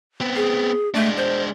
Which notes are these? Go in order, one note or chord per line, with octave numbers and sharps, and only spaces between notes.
B3 C4
G#4
G#3 A3 D4
C5